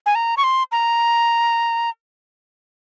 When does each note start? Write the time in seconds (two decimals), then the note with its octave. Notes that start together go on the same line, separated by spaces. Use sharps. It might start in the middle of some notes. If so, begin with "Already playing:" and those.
0.06 G#5
0.15 A#5
0.37 C#6
0.44 C6
0.72 A#5